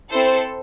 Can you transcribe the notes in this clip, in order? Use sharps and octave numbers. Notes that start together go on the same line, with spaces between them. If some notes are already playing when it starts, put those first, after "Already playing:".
C4 E4 A4 C5